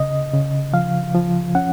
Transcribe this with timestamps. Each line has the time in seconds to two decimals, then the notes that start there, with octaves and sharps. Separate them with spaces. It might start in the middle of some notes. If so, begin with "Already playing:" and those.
Already playing: C#3 D#5
0.34 C#3
0.73 F3 F5
1.15 F3
1.55 C#4 F#5